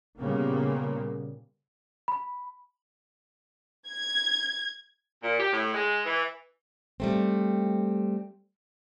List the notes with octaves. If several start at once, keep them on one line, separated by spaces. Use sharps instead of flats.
A#2 C#3 G3 A#3 B3
B5
G#6
A#2
G4
A2
G#3
E3
G3 A3 C4